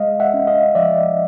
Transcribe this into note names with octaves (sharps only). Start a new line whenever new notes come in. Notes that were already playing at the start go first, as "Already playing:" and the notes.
Already playing: G#3 D#5 F5
E5 F#5
C#4
D#5 F5
F3 D5 E5